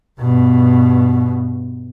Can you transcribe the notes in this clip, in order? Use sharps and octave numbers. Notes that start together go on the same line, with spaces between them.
G2 B2